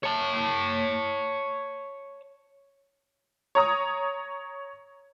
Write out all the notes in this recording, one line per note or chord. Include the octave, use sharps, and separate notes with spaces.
C#5 A5
C#5 A#5 D#6